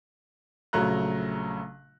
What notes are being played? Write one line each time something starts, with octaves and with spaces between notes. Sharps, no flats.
A#1 C#3 F#3 A3 A#5 F#6